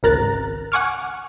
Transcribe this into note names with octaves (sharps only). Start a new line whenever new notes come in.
G#1 C#2 A#4 A#5 F#6 A6
F#5 G#5 C#6 D6 F6